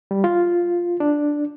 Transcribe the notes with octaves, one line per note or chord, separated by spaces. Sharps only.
G3
F4
D4